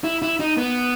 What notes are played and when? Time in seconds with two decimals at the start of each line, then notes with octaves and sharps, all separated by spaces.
0.04 E4
0.22 E4
0.40 D#4
0.57 B3